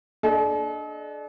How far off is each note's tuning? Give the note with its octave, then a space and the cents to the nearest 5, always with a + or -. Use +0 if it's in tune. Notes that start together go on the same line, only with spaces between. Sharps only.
D4 +15 A4 -45 D#5 +0